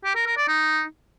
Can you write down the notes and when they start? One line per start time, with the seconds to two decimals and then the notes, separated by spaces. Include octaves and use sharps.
0.04 G4
0.15 A#4
0.26 A#4
0.37 D5
0.48 D#4